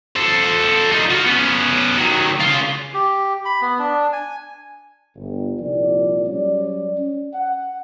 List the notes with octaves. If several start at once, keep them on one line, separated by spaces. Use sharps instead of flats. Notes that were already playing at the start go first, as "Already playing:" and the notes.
A4 C5
D#4 F4
F4 F#4
B3 C#4
D#3 F#3
C#3 F4
G4
B5
B3
D4
G#5
G1
C2 A#2 F3 D#4 D5
F#3 G3 C#4 C#5 D5
C#4
F#5